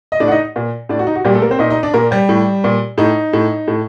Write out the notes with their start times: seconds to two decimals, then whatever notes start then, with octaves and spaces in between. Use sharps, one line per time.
0.12 D#5
0.20 A2 D4 D5
0.28 F#5
0.31 D#4 D#5
0.56 A#2
0.89 A2 D4 D5
0.99 F#4
1.07 D#4
1.15 F#4
1.24 A#2 G3 G4
1.34 A3 A4
1.42 A#3 A#4
1.51 C4 C5
1.59 A#2 D#4 D#5
1.70 D#4 D#5
1.83 D4 D5
1.94 A#2 A#3 A#4
2.11 G3 G4
2.29 A2
2.64 A#2
2.98 A2 D#4
3.33 A2
3.68 A2